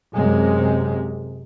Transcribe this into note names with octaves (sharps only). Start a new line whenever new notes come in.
F#2 C3 G#3